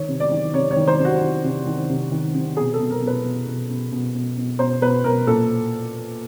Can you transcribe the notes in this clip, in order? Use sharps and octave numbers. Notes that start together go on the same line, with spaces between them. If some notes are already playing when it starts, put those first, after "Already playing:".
Already playing: D#3 C#5
C3
D5
D#3
C3 C#5
C#5
D#3
C5
C3
F#4
D#3
C3
D#3
C3
D#3
C3
B2 G#4
A4
B2
A#4
B2
B4
B2
B2
B2
B2
B2
B2
B2 C5
B2 B4
B2 A#4
A#2 A4